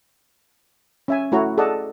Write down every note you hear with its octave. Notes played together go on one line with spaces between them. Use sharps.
C#4 E5 G#5
A3 E4 F#4 C#5 A#5
G#4 A4 D5 D#5 F#5 A5